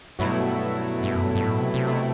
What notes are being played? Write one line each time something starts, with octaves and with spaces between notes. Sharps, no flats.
G2 B2 F#3 A3 E4
F#2
G2
F#2
G2
G2
A2
C3
C3
B2 A3 E4